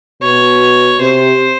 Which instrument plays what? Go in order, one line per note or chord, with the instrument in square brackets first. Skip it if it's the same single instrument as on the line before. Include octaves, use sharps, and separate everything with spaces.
[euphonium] B2 [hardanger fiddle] C#5
[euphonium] C3 [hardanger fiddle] C5